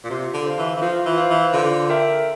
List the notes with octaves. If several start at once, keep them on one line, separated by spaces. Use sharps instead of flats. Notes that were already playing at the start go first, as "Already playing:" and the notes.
A#2
C3 F4
D3
C5 F5
E3
E3
F3 F4
E3
C5 F5
E3
D3 F4
A#4 E5 G5